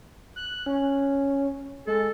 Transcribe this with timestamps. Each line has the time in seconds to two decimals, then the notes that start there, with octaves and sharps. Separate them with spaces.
0.36 F#6
0.66 C#4
1.87 G#3 A4